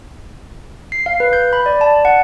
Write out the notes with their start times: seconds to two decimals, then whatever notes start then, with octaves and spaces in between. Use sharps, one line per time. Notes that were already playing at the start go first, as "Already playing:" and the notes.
0.92 C7
1.06 F5
1.20 B4
1.33 G6
1.53 B5
1.66 D5
1.81 A5
2.05 F#5